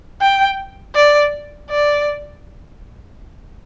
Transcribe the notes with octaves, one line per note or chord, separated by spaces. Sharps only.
G5
D5
D5